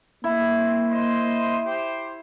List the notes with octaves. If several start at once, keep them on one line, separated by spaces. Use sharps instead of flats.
A#3 E4
C4
C5 D#5 C6
G4 C5